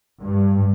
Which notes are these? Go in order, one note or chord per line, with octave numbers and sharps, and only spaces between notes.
G2